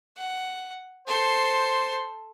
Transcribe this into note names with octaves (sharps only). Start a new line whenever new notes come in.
F#5
A4 C5 C6